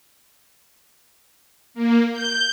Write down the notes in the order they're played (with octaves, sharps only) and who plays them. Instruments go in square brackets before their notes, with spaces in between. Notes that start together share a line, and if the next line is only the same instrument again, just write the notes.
[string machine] A#3
G6